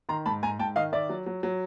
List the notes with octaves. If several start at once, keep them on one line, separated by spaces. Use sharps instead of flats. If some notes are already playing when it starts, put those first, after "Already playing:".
D#3 A#5 C6
G#2 A5 B5
G#2 G#5 A#5
G#2 G5 A5
D#3 D#5 F5
D#3 D5 E5
F#3
F#3
F#3